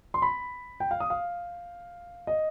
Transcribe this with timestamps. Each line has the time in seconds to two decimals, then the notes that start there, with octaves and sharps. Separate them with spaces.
0.14 C6
0.22 B5
0.80 G5
0.91 F5
1.00 D#6
1.10 F5
2.27 D#5